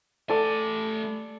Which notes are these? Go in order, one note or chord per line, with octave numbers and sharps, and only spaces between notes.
A3 A4 D5 G#5